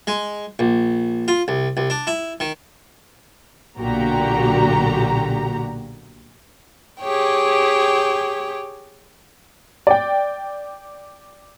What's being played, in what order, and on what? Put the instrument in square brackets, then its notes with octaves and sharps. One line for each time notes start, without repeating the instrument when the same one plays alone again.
[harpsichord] G#3
A#1
F4
C2
C2
D4
E4
D#3
[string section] B1 A#2 D3 F#4 G4 A#5
[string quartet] G4 G#4 C#5 G5
[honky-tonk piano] D5 G5